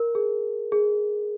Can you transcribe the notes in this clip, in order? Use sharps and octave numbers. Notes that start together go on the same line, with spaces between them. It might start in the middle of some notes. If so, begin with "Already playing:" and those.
Already playing: A#4
G#4
G#4